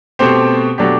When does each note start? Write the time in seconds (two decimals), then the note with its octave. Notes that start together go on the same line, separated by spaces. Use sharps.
0.19 B2 A3 C4 G4 C5
0.78 B2 F#3 A3 D4 G4